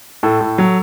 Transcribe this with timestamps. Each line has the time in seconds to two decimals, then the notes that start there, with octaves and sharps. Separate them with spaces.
0.23 A2 A4
0.41 A2
0.58 F#3